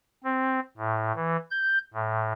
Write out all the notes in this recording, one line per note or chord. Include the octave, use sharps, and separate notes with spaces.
C4
A2
E3
G6
A2